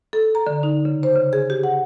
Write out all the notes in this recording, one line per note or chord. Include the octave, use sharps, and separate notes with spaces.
A4
A#5
D3
D#4
C#3
C5
C#3
G#4
G4
F#5